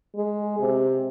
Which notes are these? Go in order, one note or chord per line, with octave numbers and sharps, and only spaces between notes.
G#3
C3